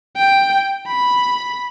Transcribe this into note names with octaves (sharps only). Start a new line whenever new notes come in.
G5
B5